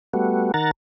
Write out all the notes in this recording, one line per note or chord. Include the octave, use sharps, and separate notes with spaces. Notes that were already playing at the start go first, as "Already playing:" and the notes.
G3 A3 B3 F#4
D#3 A#4 F#5 A#5 A6